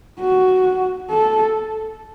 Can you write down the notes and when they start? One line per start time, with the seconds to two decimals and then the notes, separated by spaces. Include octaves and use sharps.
0.20 F#4
1.11 A4